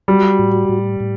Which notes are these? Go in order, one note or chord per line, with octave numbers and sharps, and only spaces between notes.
G3 F#4
A2
A2
A2